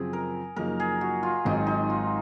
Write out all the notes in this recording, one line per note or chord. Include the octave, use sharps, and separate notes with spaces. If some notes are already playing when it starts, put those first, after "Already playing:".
Already playing: F#2 C#3 F3 C4 G#4
A#4
F#2 C#3 F3 A#3 D#4 A#4
G#4
F#4
F4
G#1 G#2 D#3 F#3 C4 D#4
D#4
F4